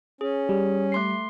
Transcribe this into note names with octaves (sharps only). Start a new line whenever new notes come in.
C#4 G#4
G3
A3 C6 C7